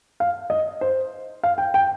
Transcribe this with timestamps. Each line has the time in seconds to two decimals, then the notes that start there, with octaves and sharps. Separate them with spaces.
0.20 F5
0.50 D#5
0.81 C5
1.43 F5
1.58 G5
1.74 G5